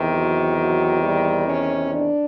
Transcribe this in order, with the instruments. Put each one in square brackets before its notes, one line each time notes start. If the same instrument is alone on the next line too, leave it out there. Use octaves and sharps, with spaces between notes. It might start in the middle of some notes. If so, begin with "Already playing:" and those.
Already playing: [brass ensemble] E2 C3 D#3
F#3
F#3
G3
C#4
D4